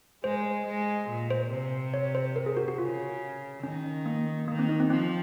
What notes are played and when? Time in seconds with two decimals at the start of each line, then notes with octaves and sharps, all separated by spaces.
0.24 G#3 C5
0.67 G#3
1.09 A#2
1.30 C5
1.51 C3
1.94 C#5
2.15 C5
2.36 A#4
2.46 G#4
2.57 F#4
2.68 F#4
2.78 C#3 F4
3.63 D#3 C#4
4.06 A#3
4.48 D#3 A#3
4.59 C4
4.69 D#4
4.80 C4
4.90 F3 C4